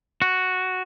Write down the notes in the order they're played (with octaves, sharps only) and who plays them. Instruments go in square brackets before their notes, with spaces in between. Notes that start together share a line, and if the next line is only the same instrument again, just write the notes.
[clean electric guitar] F#4